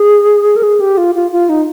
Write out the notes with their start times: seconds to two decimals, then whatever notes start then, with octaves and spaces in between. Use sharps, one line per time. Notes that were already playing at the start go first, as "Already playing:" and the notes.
Already playing: G#4
0.56 A#4
0.63 G#4
0.80 G4
0.98 F4
1.15 F4
1.32 F4
1.49 D#4